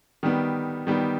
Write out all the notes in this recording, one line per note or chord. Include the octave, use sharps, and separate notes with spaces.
D#3 G3 B3
D#3 G3 B3